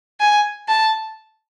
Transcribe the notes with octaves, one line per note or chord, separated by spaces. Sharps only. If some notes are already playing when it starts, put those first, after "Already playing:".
G#5
A5